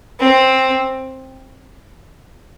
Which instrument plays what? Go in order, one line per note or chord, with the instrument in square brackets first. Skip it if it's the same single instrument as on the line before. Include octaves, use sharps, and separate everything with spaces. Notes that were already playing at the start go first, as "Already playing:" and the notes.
[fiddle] C4